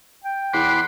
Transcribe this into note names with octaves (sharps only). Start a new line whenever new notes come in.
G5
E2 F#5 B5 C6 D6